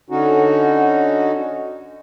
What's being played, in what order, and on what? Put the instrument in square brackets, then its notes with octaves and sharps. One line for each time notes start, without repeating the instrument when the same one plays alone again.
[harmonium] D3 C#4 D#4 F#4